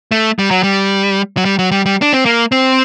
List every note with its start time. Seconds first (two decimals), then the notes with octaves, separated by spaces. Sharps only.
0.12 A3
0.39 G3
0.51 F#3
0.63 G3
1.37 F#3
1.45 G3
1.59 F#3
1.72 G3
1.86 G3
2.02 D4
2.13 C4
2.26 A#3
2.52 C4